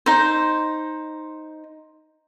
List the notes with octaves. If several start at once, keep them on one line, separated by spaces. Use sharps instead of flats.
D#4 C5